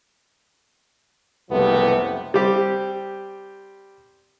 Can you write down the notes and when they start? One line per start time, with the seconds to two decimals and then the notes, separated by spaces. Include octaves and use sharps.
1.51 F#1 C2 C3 F3 A3 B3
2.34 G3 C4 G4